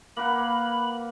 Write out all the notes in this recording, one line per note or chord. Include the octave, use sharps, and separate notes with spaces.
A#3 B4 F#5 B5